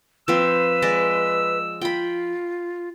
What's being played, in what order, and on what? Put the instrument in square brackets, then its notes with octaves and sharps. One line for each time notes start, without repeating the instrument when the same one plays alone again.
[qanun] F3 C4 [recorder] B4 [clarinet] E6
[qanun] G#3 D5 D#5
[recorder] F4 [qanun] G5 B5